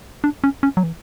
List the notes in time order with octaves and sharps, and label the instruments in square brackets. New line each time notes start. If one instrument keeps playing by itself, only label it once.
[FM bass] D4
C#4
C#4
F#3
E3